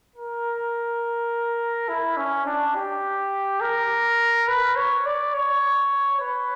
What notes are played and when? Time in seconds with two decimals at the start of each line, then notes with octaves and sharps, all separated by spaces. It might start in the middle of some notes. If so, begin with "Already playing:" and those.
0.16 A#4
1.89 E4
2.17 C#4
2.46 D4
2.76 G4
3.61 A#4
4.48 B4
4.76 C#5
5.06 D5
5.34 C#5
6.20 B4